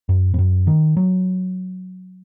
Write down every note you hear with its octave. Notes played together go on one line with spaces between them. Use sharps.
F#2
F2
F#2
D#3
F#3